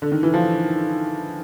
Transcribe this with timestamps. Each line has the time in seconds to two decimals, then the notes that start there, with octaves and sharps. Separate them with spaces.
0.02 D3
0.12 D#3
0.23 E3
0.34 F3